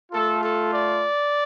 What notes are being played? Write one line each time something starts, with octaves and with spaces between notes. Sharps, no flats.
A3 F4 A4
A4
D5